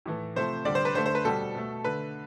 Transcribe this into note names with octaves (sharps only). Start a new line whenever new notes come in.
A2 E3 A3
C3 F3 A3 C5
D3 G3 D5
C5
B4
D3 A3 C5
C5
B4
B2 G3 A4
B2 A3
D3 A3 B4